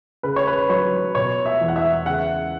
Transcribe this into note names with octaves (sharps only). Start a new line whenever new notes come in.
C#3 B4
C#5
B4
F#3 C#5
B2 C#5
E5
E2
F#5
E5
C#3 F#5